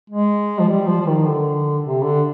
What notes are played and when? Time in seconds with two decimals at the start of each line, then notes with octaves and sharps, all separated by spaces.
0.10 G#3
0.59 F3
0.68 G3
0.87 F3
1.01 F3
1.07 D#3
1.27 D3
1.84 C3
2.04 D3